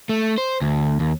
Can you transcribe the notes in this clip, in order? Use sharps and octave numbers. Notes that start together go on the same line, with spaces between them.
A3
C5
D2
D#2